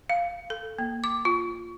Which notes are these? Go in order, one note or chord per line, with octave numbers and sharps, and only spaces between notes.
F5
A4
A#3
D6
F4